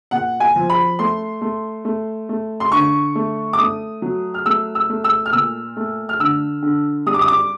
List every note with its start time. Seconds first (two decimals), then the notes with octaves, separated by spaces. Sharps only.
0.11 A#2 F#5
0.40 G#5
0.56 F3
0.70 B5
0.99 A3 C6
1.41 A3
1.85 A3
2.29 A3
2.60 C6
2.72 D3 C#6
3.15 A3
3.53 D6
3.59 A3 D#6
4.02 F#3
4.34 F6
4.46 A3 E6
4.75 E6
4.89 A3
5.04 E6
5.26 F6
5.33 A#2 E6
5.77 A3
6.09 F6
6.20 D3 E6
6.62 D3
7.06 G3 D#6
7.14 D6
7.21 D#6
7.28 D6